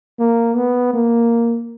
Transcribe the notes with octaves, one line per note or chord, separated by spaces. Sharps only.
A#3
B3
A#3